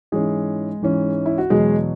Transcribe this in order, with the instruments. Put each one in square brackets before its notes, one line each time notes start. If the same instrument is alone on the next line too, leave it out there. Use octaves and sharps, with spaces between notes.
[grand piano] G#2 E3 G#3 C#4 G#4
G#2 E3 C#4
E4
F#4
E2 B2 F#3 G#3 G#4